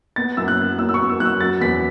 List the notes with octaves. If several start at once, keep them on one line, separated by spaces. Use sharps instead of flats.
B3 A6
F#2 E6
F#6
F#3
F#2 E6
E6
C#6
B3
E6
F#2 F#6
E6
F#3 A6
E2 B6